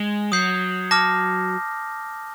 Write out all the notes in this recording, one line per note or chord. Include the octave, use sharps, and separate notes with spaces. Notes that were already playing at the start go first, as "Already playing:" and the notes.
Already playing: G#3
F#3 D#6 G6 C7
A5 D6 F6 A#6